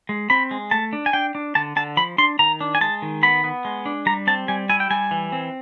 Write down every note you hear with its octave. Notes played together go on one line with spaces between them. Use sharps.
G#3
C4 B5
G#3
A3 A5
D4
G#5
D4 G5
D4
D3 A5
D3 A5
F3 B5
D4 C6
D#3 A#5
D4
G#5
G#3 A5
D#3
B3 B5
B3
G#3
D4
G3 A#5
C4 A5
G3 G#5
E4 G#5
G5
G3 G#5
E3
C4